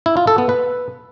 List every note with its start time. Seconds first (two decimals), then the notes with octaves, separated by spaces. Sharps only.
0.06 E4
0.17 F4
0.27 A4
0.38 B3
0.49 B4